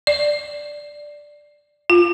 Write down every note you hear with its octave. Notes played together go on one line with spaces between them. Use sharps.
D5
F4